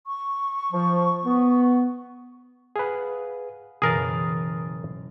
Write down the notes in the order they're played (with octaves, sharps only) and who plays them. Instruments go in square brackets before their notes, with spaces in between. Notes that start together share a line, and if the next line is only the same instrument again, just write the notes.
[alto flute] C#6
[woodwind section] F3
B3
[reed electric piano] G#4 B4 [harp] F5 F#5
[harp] F#1 B2 E3 [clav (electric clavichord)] G#4 A#4 [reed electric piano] D#6 A6